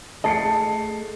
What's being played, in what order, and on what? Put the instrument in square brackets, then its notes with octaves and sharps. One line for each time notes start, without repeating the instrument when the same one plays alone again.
[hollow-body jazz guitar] A3 G#4 D#5 [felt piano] A5 C7 C#7